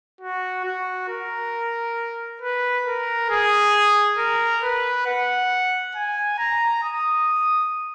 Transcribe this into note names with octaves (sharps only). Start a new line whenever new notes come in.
F#4
F#4
A#4
B4
A#4
G#4
A#4
B4
F#5
G#5
A#5
D#6